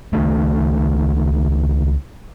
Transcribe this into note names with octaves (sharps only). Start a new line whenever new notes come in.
C#2 D#3 A3